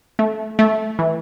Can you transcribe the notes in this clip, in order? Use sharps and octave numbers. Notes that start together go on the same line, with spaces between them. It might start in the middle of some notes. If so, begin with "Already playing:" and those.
A3
A3
E3